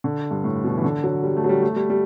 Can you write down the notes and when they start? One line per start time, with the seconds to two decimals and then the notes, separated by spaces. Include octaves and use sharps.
0.04 D3
0.31 G2
0.44 A2
0.64 B2
0.78 E3
0.84 D3
1.04 F#3
1.24 G3
1.37 A3
1.44 F#3
1.49 G3
1.63 A3
1.76 G3
1.90 G3